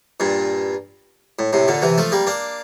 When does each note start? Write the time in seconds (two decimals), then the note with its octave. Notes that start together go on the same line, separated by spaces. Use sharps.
0.20 G2 A#2
1.39 A2
1.53 A2 C3
1.68 A#2 D3
1.82 C3 E3
1.98 F3 A3
2.12 G3 A#3
2.27 A#3 D4